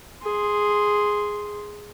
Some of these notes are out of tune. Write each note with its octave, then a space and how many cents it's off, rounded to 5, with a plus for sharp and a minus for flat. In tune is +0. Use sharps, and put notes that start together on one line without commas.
G#4 +0 C6 +0